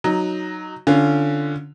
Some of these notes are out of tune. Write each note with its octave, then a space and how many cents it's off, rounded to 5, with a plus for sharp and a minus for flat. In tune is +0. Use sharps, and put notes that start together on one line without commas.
F#3 +0 D#4 +0
D3 +0 C#4 +0 F4 -15